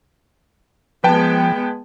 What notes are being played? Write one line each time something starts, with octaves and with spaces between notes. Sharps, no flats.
F3 G#3 B3 B4 G5 A5